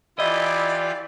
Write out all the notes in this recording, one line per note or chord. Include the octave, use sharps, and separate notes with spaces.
E3 E4 F4 G4 D5 D#5